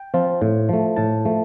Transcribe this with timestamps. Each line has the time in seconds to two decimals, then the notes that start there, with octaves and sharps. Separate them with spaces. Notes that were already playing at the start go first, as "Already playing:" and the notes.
Already playing: G5
0.14 F3 C4 F4
0.42 A2
0.69 F3 A3
0.96 A2 A5
1.25 F3 A3